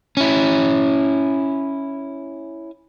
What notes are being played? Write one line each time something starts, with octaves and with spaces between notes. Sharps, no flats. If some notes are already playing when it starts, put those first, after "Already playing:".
C#4 E4